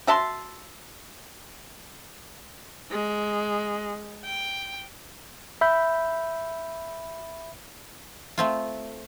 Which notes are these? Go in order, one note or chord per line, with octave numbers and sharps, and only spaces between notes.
F#4 E5 A5 C6
G#3
G5
E5 B5 G6
A3 C4 F4